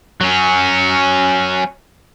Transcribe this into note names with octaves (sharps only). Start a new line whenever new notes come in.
F#3 C#4